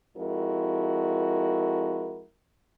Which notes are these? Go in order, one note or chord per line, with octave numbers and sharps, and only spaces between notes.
F2 G#3 E4 F#4 A#4